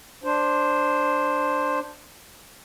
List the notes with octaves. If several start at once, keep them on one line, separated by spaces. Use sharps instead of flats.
D4 C5